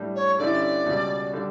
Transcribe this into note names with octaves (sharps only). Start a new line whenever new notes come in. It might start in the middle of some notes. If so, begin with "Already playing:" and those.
Already playing: A2 G3 D4
C#5
G2 D3 G3 C#4 E4 D5
C#2 B2 G3
D3 G3 D4